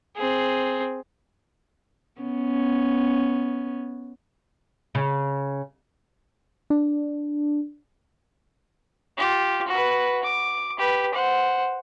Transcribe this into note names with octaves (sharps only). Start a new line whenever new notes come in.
C4 G#4
B3 C#4
C#3
D4
F4 G4
F#4 B4
D6
G4 B4
C5 F#5